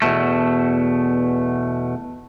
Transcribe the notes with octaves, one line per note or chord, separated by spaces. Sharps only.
E2 B2 A3